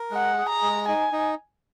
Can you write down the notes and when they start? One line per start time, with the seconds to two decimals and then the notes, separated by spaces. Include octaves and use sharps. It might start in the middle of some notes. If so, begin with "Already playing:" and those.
Already playing: A#4
0.11 G#3 F#5
0.38 G#4
0.49 A#5
0.62 G#3
0.88 D#4 G#5
1.13 D#4